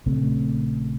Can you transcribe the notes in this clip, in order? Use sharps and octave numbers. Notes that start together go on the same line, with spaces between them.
A#1 C#3 A3 C4